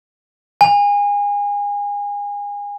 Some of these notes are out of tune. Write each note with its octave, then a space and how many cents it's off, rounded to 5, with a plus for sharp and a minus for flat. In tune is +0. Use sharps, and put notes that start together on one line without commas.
G#5 -30